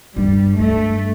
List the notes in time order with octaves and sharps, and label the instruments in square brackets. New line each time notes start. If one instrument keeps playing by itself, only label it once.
[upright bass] G2 [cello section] G3
[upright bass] G2 [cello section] A3